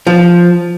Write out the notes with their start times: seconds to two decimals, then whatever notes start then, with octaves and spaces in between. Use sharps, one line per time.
0.07 F3